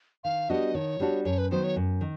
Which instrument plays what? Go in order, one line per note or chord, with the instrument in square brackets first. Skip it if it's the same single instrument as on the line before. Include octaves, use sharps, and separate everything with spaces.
[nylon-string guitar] D#3 [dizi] F5
[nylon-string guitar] G3 B3 D4 F#4 [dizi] D#5
[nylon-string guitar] D#3 [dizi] C#5
[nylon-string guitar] G3 B3 D4 F#4
[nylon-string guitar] F#2 [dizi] C#5
[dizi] B4
[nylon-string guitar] D#3 F#3 B3 [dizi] C5
[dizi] C#5
[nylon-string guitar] F#2
D#3